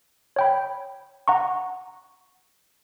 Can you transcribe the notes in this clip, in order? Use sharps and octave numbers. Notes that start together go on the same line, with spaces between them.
C#5 G5 B5
F#5 A#5 C#6